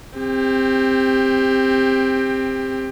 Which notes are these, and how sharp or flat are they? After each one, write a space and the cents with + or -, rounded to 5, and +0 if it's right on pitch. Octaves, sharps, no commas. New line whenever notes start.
C4 +5 G4 +25